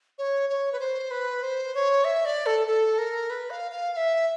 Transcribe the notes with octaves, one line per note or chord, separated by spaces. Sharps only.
C#5
C#5
B4
C5
B4
C5
C#5
E5
D5
A4
A4
A#4
B4
F5
F5
F5
E5